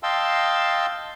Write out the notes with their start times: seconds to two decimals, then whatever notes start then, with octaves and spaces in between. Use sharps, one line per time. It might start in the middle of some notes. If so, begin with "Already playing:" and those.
0.03 D#5 F5 G5 A5 C6 E6